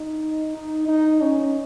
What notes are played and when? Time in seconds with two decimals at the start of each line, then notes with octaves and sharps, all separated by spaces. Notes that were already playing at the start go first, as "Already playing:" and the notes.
Already playing: D#4
0.55 D#4
0.88 D#4
1.21 C#4